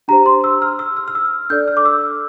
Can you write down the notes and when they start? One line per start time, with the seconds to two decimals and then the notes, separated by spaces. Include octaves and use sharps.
0.08 D4 G4 C5 A#5
0.26 C6
0.44 E6
0.62 F6
0.79 E6
0.97 F6
1.08 F6
1.15 E6
1.50 D4 A4 D5 G6
1.68 F6
1.77 D6
1.85 E6